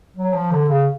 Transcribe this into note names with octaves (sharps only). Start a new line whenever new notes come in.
F#3
F3
D3
C#3